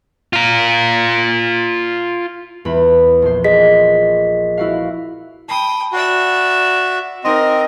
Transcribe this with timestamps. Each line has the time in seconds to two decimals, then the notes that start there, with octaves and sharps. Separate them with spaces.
0.33 F4 A#5
2.65 E2 B5
3.22 A#1 C5
3.44 G#4 D#5 B6
4.58 E4 F#4 F5
5.48 G5 A5 B5 D#6
5.93 F#4 D5 E5
7.24 C4 D#4 A#4 D#5 C6